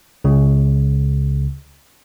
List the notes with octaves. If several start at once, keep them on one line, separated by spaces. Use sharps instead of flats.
C#2 C#3